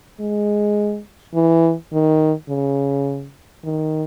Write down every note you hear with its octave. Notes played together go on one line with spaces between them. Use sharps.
G#3
E3
D#3
C#3
D#3